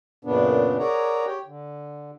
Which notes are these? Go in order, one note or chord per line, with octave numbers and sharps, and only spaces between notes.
F#2 A#2 C#3 B3 D4
G#4 A#4 C#5 D5 F#5 A#5
G4 C#5 G5
D3